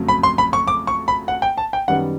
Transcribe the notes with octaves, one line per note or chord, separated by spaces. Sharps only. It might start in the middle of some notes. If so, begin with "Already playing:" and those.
Already playing: F2 C#3 F#3 A3
B5
C6
B5
C#6
D6
C#6
B5
F#5
G5
A5
G5
F#2 D#3 G3 B3 F#5